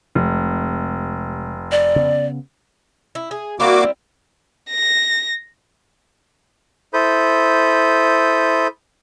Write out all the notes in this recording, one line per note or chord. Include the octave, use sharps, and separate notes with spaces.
F1 C3 G#3
D5
C#3 B3
E4
G#4
G3 A#3 C4 E4 F#4 D6
A#6
E4 A4 C5 B5 D#6 G6